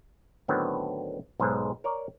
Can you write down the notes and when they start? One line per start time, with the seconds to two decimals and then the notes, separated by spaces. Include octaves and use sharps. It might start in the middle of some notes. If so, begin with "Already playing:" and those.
0.48 A2 D3 D#3 F#3 B3 C4
1.40 B1 G#2 G#3 C5
1.84 A#4 C#5 D5